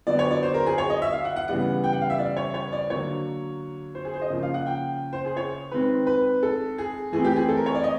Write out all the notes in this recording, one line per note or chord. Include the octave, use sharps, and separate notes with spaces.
D3 F#3 B3 D5
C#5
D5
C5
A#4
G#4
C#5
D#5
E5
F5
F#5
F#5
C#3 E3 G3 B3 F#5
G5
F#5
F5
E5
D5
C#5
C#5
D5
D3 F#3 A#3 C#5
C5
G#4
C5
D#5
C#3 F3 A#3
F5
F#5
G5
C5
G#4
C#5
D#3 G#3 C4 B4
B4
A4
G#4
E3 A3 C4 G#4
G4
G#4
A4
A#4
C#5
D5
D#5